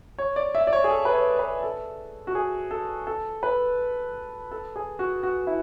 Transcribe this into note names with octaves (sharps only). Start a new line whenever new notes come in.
C#5
D5
E5
D5
C#5
G#4
A4
B4
C#5
B4
A4
F#4
G#4
A4
A4
B4
A4
G#4
F#4
F#4
E4